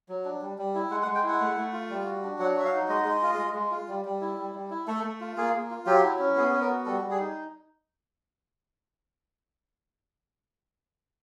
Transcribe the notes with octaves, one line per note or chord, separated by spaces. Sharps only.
F#3
D4
G3
G3
E4
G#3 F#5
F#5
G#3
G5
E4 F#5
A3
A3
F4
G3
F#4
D4
F#3 F#5
F#4 E5
F5
D#4
G#3 D#5
G#3
F4
G#3
G#3
F4
G3
G3
E4
G3
G3
E4
A3 A4
A3
F4
A#3 G#4
A#3
F4
F#3 G4
E4
C#4
B3 G#4
B3
A#4
F#4
G3 A4
G3
G#4
D#4